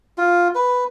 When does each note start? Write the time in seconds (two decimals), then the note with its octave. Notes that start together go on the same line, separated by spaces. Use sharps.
0.18 F4
0.55 B4